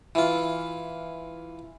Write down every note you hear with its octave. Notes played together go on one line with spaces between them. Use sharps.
E3 F4